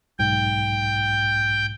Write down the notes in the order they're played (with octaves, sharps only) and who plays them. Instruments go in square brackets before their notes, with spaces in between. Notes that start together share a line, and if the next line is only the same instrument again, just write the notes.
[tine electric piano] B1 G#2 [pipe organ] G5